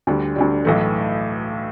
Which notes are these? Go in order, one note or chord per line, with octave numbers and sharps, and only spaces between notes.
D2 D3 G3
D2 D3 G3
B1 A2 E3 A3